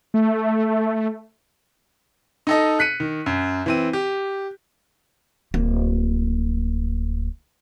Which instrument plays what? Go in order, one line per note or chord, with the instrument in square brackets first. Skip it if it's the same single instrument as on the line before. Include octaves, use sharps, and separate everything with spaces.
[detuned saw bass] A3
[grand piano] D#4 A4 D#5
F#6 B6 C#7 D#7
D#3
F#2
E3 C4 D#7
G4
[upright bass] D1 A#3